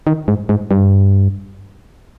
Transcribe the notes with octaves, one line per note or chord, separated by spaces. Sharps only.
D#3
G#2
G#2
G2